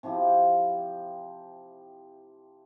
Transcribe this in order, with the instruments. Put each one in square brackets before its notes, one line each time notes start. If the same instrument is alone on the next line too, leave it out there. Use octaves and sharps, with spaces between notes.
[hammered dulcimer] C3 F3 E4 G4